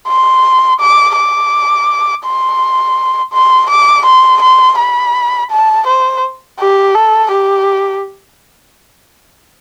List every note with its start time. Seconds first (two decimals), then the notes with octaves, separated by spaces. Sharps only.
0.08 C6
0.80 D6
1.17 D6
2.25 C6
3.33 C6
3.70 D6
4.05 C6
4.41 C6
4.79 B5
5.50 A5
5.87 C5
6.59 G4
6.95 A4
7.31 G4